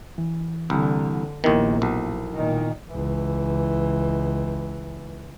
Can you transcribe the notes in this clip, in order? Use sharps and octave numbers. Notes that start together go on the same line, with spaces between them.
E3
C2 D3
A#1 D#2 D#3 B3 E4 A#4
B1
A#2 D#3
C#2 E3